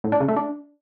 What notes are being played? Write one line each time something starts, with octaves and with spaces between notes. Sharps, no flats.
A2
D4
C#3
A3
D4